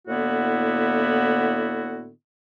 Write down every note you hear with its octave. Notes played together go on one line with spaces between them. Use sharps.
A2 D3 A#3 B3 E4 F#4